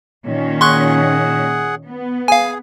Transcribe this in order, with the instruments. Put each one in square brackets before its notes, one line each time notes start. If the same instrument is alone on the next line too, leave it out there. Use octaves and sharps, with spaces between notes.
[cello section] A#2 D#3 C#4
[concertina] G#4 F#5 [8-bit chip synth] C6 C#6 F#6
[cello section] B3
[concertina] G#4 [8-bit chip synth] F5 G#5